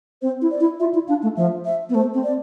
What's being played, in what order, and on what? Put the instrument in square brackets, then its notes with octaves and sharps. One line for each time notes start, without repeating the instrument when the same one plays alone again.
[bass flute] C4 [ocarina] C5
[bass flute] E4
[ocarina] D5
[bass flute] E4
[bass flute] F4 [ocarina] E5
[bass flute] E4
[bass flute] D4 [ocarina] F5
[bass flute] A3
[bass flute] F3 [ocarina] E5
[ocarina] E5
[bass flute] B3
[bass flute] A3 [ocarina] C5
[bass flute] C4
[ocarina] D5